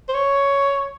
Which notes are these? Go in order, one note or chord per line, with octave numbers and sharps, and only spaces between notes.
C5
C#5